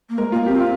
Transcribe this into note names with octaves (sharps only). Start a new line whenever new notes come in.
A#3
G#3 A#4
A#3 F4
C4 G4
F4